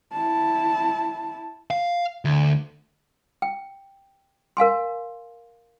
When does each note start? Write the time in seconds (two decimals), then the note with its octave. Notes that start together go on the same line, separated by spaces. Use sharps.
0.12 E4 A5
1.71 F5
2.25 D2
3.42 G5
4.57 A#4 F5 G#5 C6